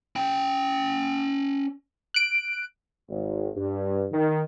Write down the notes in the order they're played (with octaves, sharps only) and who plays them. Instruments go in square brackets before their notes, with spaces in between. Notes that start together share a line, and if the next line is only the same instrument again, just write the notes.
[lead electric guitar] C#4 G5
[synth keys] F#6 D7
[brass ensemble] G#1
G2
D#3